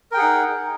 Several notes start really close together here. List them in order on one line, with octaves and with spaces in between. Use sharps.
A#4 G5 G#4 F#5 D#4